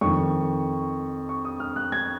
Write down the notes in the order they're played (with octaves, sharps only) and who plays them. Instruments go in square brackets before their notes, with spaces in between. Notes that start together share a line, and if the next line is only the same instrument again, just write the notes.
[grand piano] F2 D#3 C#6
C#6
D#6
F6
F#6
G#6